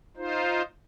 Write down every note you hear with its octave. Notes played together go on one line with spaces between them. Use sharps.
D#4 F4 C5